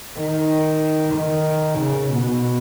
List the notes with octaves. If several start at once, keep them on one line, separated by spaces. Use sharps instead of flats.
D#3
D#3
C#3
B2